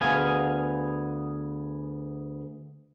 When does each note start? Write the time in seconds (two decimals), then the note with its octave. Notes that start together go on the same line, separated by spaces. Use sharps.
0.01 D2 B3 G#4 F5 G#5